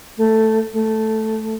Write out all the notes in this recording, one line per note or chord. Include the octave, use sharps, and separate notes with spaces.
A3
A3